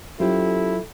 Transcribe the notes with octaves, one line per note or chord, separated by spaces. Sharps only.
F#3 C#4 E4 F4 G4 A4 C5